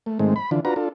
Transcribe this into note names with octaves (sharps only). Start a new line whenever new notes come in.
A3
G#2 D#3 G#3 A3 C4
B5
D3 E3 D4 F4
D4 F4 F#4 B4 A#5
D4 F4 A4